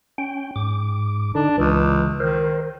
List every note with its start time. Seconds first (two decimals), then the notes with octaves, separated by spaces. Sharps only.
0.18 C#4 G5
0.56 G#2 D6
1.35 D3 D4 D#4
1.58 C#2 C#3 E3
2.20 D#3 A#4 C5